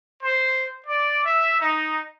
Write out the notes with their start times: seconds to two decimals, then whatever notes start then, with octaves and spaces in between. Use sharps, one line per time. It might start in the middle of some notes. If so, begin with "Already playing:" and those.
0.22 C5
0.86 D5
1.24 E5
1.60 D#4